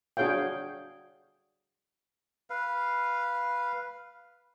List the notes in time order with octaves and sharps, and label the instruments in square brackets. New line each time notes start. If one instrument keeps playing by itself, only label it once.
[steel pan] D4 F#4 G#4 C#5 F5 G5
[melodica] B4 F5